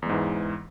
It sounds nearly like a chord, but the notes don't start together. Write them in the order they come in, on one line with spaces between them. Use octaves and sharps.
E2 G#3 G#2 E3